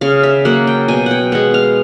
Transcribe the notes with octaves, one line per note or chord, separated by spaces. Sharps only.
C#3 F5
E5
F#3 A#3 F#5
G5
B2 G#5
F#5 G5
G#3 B3 F#5
F5